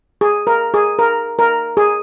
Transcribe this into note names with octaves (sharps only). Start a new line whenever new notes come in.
G#4
A#4
G#4
A#4
A#4
G#4